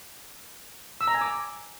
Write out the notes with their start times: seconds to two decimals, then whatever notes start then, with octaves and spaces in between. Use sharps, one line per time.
1.01 E6
1.08 A#5
1.14 G#5
1.21 D6